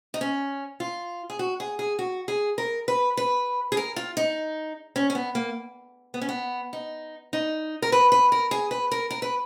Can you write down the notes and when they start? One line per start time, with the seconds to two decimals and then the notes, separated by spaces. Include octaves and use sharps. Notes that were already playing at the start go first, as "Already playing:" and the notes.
0.14 D#4
0.21 C#4
0.80 F4
1.30 G#4
1.39 F#4
1.60 G#4
1.79 G#4
1.99 F#4
2.28 G#4
2.58 A#4
2.88 B4
3.17 B4
3.72 G#4
3.77 A#4
3.96 F4
4.17 D#4
4.96 C#4
5.10 C#4
5.15 B3
5.35 A#3
6.14 B3
6.21 C#4
6.29 B3
6.73 D#4
7.33 D#4
7.82 A#4
7.92 B4
8.12 B4
8.32 A#4
8.51 G#4
8.71 B4
8.92 A#4
9.10 A#4
9.22 B4